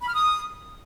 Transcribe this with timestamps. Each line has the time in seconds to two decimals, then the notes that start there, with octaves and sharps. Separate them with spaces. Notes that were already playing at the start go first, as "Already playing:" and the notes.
0.01 B5
0.08 F6
0.14 D#6